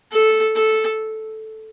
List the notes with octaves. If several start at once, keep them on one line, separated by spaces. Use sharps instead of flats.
A4
A4